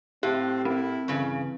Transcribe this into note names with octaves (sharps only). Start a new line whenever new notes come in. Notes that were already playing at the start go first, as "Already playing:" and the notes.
A2 C4 G4
C4 E4
G2 C#3 E3